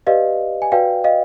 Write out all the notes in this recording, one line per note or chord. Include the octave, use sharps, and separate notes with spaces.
G4 B4 D5 D#5 F5
G#5
F#4 B4 D5 F5 G5
D#5 F5